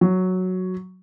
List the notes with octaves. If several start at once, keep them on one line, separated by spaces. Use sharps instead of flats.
F#3